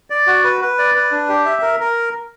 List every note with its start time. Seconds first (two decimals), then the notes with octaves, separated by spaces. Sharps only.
0.10 D5
0.27 F#4
0.44 B4
0.62 B4
0.78 D5
0.95 B4
1.11 D4
1.29 G4
1.45 E5
1.62 A#4
1.80 A#4